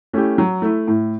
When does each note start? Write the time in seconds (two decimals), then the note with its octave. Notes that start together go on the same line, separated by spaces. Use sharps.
0.13 A3 C#4 E4 G4
0.38 F#3
0.62 A3 E4
0.87 A2